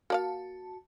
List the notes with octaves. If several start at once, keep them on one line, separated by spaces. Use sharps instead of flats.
A#3 F#4 D5 F5 A5